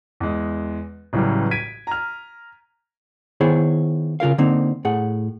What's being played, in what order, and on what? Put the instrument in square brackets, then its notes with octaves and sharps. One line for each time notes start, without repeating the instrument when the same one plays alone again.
[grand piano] E2 G#3
A1 C#3 E3 F#3 G3
G#6 B6 D7 D#7
A#5 F6
[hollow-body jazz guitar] D#3 B3 E4 G#4 C5 C#5
C#3 F4 A#4 F5
D3 A#3 C4 D#4
A2 G#4 F#5